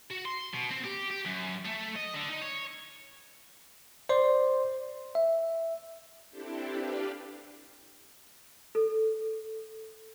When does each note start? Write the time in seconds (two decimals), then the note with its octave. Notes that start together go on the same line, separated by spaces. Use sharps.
0.11 F#4
0.25 C6
0.54 B2
0.71 C4
0.84 G4
1.10 G4
1.25 F#2
1.65 A3
1.96 D#5
2.14 D3
2.29 D#4
2.41 C#5
4.09 C5 D5 C6
5.15 E5
6.31 C4 D4 E4 G4 A4
6.71 D4 G4 B4 F5
8.75 A4